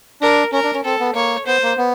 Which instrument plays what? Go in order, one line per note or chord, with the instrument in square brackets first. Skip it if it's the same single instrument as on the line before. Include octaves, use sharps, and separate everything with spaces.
[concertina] D4 [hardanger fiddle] A#4
[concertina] C#4 [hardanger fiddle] A#4
[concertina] D4
C#4
[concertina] C4 [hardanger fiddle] A4
[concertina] B3
[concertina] A#3 [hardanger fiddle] C#5
[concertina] B3 [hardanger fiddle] C5
[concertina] A#3
B3